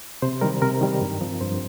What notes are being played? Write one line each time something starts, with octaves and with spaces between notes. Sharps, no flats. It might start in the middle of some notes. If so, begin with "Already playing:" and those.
C3 C5
D#3 G3 A#4
C3 A#4
D#3 G3
G2
F3 C4
G2 C5